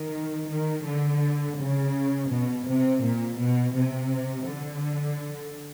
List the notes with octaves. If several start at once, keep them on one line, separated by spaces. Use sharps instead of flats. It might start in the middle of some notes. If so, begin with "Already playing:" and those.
Already playing: D#3
D#3
D3
C#3
B2
C3
A#2
B2
C3
D3